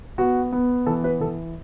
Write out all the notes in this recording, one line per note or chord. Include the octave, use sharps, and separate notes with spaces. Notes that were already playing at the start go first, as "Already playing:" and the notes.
B3 F#4
B3
E3 A4
B4
E3 A4